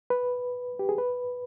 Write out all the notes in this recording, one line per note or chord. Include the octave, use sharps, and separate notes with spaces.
B4
G4
G#4
B4